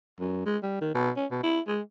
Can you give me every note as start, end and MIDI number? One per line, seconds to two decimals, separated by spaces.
0.20 0.43 42
0.46 0.57 56
0.63 0.76 55
0.81 0.93 51
0.95 1.11 47
1.16 1.26 61
1.31 1.38 47
1.43 1.60 64
1.68 1.81 56